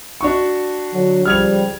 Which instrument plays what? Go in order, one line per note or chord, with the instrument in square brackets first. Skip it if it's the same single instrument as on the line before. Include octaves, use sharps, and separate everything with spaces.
[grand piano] D4 F#4 C#6
[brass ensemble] D3 F#3
[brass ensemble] C#2 F3 G3 [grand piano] F6 G#6 F7